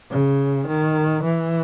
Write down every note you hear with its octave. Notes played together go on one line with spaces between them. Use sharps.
C#3
D#3
E3